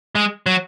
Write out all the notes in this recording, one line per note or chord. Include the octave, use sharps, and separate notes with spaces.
G#3
F#3